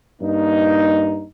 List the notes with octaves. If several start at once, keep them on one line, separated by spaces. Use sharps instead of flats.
G2 A#3 D#4